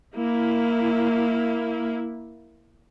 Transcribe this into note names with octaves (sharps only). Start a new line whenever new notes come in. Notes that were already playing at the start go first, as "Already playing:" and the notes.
A#3 E4